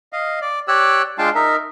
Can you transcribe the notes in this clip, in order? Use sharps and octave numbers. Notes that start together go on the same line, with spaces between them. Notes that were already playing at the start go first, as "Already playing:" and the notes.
D#5 F5
D5
G4 C#5 D5 E6 F#6
G#3 D4 F4 F5 G5 A5
D#4 A#4 E5